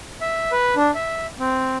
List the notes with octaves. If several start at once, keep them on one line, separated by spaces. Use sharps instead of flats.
E5
B4
D4
E5
C4